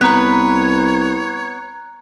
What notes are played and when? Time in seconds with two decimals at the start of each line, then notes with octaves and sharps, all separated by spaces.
0.01 C2 B3 B4 C#5 A#5 F#6